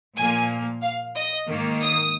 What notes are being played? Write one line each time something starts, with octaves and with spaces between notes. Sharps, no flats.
A#2 F3 A#3 G#5
F5
D#5
G#2 D#3 A#3
D#6